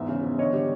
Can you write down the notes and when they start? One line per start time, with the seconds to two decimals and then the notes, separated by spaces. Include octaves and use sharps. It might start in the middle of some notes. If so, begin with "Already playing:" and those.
Already playing: E2 G#2 E5
0.09 C#3
0.23 E2
0.38 D3 C#5 D#5
0.53 G3